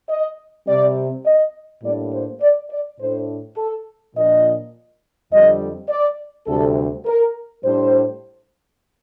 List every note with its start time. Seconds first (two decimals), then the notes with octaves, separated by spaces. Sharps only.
0.09 D#5
0.67 C3 G3 C4 D5
1.25 D#5
1.83 A2 G3 A#3 D4 D5
2.13 C5
2.42 D5
2.71 D5
2.99 A2 A3 D4 C5
3.57 A4
4.15 A#2 F3 A#3 D4 D#5
5.31 F2 D3 G3 C4 D#5
5.89 D5
6.47 D2 C3 G3 C4 A4
7.06 A#4
7.63 A2 G3 D4 C5